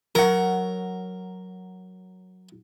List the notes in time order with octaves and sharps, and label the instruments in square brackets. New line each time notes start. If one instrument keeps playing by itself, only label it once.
[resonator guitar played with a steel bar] F#3 F#5 [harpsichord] A#4